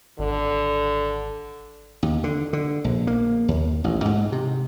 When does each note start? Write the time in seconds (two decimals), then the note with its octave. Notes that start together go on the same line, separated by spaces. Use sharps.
0.19 G#1 D3
2.03 D#2
2.24 D3
2.53 D3
2.84 A#1
3.07 A#3
3.48 D#2
3.84 A1
4.05 G#2
4.32 C3